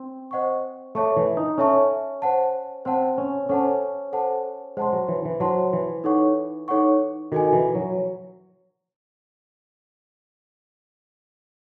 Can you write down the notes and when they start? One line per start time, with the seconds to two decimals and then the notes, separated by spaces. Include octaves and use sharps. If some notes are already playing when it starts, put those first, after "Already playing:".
Already playing: C4
0.31 C5 D#5 F#5 C#6
0.95 A3 A4 C#5 E5 A5 C#6
1.17 E3
1.37 D#4
1.58 C#4 A4 C#5 E5 A5 C#6
2.22 C5 F#5 A5
2.85 C4 C5 F#5 A5
3.18 C#4
3.49 C#4 A4 C5 F#5 A5
4.13 A4 C5 F#5 A5
4.77 G#3 C5 F#5 A5 C6
4.93 F#3
5.08 E3
5.25 E3
5.40 F#3 C5 F#5 A5 C6
5.73 E3
6.04 D#4 A4 C#5 F#5 C#6
6.68 D#4 A4 C#5 F#5 C#6
7.32 D#3 F#4 A4 D#5 G#5
7.53 E3
7.75 F#3